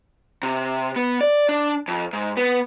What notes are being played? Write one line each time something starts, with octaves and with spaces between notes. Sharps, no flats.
C3
B3
D5
D4
F2
G#2
B3